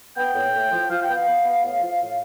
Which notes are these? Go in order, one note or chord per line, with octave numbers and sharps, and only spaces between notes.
B3 G5
A2
A2
F3
F3 F5
G5
B3
F5
B3
B3
A2
F3
A2